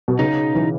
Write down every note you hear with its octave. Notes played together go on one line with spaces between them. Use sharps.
B2
C#3 D#4
E3